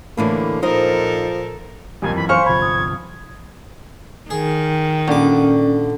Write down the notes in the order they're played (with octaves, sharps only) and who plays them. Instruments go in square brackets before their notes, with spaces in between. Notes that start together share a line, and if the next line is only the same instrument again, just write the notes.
[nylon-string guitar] A2 D3 E3 [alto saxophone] A#3
[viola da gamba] A#2 A4 A#4 [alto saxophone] F3 [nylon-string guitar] D#4 C5 D#5
[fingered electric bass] A#1 G3 [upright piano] F2 A#2 [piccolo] G#5
[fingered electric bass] F#2 E3 [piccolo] B5
[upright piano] C5 C#6 F6 [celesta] F5 G#5 C6 [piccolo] C#7
[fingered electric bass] G1 C2 F3 [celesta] B5 [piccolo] G#6
[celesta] D#6
[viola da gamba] D#3 [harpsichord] G#4
[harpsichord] A#1 D6 [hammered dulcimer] D3 [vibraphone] C#4